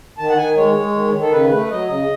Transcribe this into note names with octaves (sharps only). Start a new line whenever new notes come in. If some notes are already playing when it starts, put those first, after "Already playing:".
D#3 A5
F#5
D#3 G#5
G#3 C#5
G#3
D#3
D#3
A4
C#3 B4
A3 B4
F#3 D#5
C#3 D#5